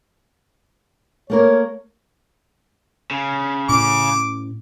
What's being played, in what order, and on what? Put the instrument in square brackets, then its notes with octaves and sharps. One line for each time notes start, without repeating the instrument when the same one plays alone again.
[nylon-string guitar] A3 A#3 A#4 [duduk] C#5
[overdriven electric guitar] C#3
[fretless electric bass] A2 C#4 [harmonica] D6